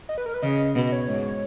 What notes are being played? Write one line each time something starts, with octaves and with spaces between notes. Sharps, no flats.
D#5
B4
A#4
B4
C#3 D#5
B2 D#5
C#5
G#2